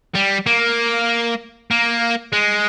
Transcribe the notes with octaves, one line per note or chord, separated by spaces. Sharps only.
G3
A#3
A#3
G#3